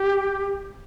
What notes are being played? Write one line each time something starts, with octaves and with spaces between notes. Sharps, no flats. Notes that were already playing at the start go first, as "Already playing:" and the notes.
Already playing: G4